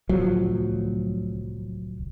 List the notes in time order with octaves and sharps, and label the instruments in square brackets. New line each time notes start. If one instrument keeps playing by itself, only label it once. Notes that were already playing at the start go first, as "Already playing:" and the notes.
[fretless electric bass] D1 C2 F3 F#3